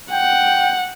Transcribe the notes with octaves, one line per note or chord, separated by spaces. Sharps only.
F#5 G5